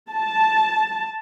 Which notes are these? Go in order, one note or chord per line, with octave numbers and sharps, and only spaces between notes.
A5